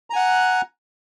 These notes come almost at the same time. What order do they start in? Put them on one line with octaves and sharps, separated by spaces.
A#5 G#5 F#5 F#6